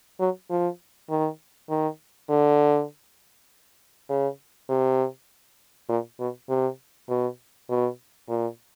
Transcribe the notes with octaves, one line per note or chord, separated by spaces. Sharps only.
F#3
F3
D#3
D#3
D3
C#3
C3
A#2
B2
C3
B2
B2
A#2